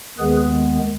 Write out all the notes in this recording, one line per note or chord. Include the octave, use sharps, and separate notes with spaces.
D#2 D#3 G#3 B3 G#4 B4